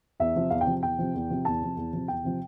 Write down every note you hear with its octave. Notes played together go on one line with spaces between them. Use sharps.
E2 E5
C3 F3
E2 F5
G5
C3 F3
E2 G5
C3 F3
E2
C3 F3
E2 A5
C3 F3
E2
C3 F3
E2 G5
C3 F3